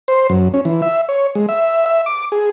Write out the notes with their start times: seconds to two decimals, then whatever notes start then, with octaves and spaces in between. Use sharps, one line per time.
0.08 C5
0.30 F#2
0.54 C#4
0.65 E3
0.82 E5
1.09 C#5
1.35 G#3
1.49 E5
1.86 E5
2.06 D6
2.32 G#4